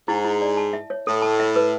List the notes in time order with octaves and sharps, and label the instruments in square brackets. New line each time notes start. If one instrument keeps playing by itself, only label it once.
[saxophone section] G#2 [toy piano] E4
[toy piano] E4
D5
A5
E5
C#5
[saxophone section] A2 [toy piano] A4
[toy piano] A5
E5
B4